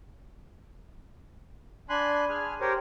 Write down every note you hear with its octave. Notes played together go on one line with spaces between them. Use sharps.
D4 G#5 B5 C6 F#6
G#4 G#5 F6
G4 A#4 C5 C#5